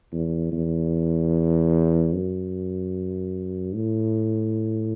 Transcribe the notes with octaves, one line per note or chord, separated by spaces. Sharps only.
E2
E2
F#2
A2